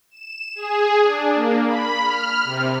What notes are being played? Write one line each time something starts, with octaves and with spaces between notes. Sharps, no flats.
E7
G#4
D4
A#3
B5
F6
C3